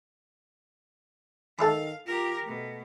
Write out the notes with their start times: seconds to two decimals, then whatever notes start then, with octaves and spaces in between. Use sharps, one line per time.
1.59 D#3 A4 E5 F5 B5
2.06 F4 G4 A#4
2.47 B2 A3